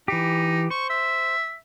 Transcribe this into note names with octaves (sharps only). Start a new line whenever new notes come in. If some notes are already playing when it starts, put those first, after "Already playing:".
E3 D#4 G4
C5 C#6
E5